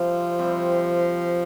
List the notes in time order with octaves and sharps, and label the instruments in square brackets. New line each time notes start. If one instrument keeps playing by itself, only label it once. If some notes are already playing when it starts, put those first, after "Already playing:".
Already playing: [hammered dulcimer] C3 G3 C4 [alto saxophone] F3
[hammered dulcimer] C3 G3 C4